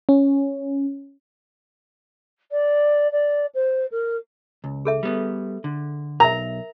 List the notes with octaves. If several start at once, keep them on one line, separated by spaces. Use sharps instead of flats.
C#4
D5
D5
C5
A#4
C#2
G#4 A4 E5
G3 B3
D3
B1 A#4 E5 A#5